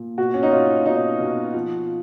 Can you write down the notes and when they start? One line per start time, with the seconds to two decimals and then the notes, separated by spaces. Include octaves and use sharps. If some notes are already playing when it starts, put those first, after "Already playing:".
Already playing: A#2
0.18 B2 F#4
0.34 C#4
0.43 D#4
0.52 B2 F4
0.86 B2 D#4
1.20 B2
1.54 F3